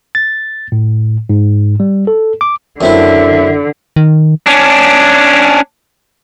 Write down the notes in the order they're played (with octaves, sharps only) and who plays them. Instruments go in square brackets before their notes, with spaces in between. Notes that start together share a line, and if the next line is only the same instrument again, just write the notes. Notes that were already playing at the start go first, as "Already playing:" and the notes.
[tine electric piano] A6
A2
G#2
G3
A4
D6
[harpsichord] F#2 C4 E4 [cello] D3 [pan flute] E5
[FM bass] D#3
[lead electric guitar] C#4 D4